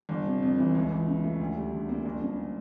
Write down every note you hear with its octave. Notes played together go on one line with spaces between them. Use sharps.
G1
C3
F2
E3
C#2
E3
C#3
A3
D2
G3
D3
A#3
G1
C#3